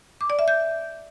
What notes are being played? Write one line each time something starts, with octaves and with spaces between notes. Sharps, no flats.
D6
D5
E5
G6